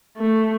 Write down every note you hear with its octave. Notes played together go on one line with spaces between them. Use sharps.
A3